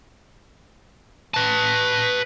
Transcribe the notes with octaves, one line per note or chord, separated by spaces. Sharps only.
B4 A5